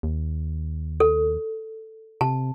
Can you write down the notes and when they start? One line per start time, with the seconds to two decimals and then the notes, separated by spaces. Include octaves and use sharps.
0.03 D#2
1.00 A4
2.21 C3 A5